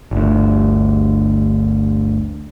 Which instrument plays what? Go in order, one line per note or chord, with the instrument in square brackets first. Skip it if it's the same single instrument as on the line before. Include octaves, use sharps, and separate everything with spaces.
[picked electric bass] G1 D2